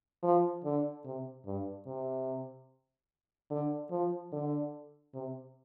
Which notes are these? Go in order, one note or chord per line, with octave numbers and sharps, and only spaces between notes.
F3
D3
C3
G2
C3
D3
F3
D3
C3